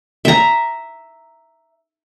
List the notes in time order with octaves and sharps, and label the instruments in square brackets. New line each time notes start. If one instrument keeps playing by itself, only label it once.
[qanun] E5 A#5